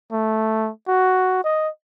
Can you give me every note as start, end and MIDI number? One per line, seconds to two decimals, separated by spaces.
0.12 0.70 57
0.88 1.41 66
1.44 1.69 75